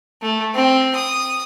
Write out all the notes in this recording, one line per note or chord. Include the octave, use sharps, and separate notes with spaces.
A3
C4
D#6